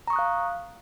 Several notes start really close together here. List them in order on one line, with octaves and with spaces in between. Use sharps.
A#5 C#6 D#6 F#6 F5